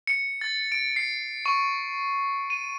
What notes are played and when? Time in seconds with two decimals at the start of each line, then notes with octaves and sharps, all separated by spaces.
0.07 C#7
0.41 A6
0.72 D7
0.96 C7
1.46 C#6
2.50 D#7